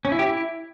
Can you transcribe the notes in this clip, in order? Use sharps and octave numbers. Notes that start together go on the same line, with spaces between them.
C#4
E4
G4
E4